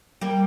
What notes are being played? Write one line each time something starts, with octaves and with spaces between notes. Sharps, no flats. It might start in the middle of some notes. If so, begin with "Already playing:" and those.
G3 A#3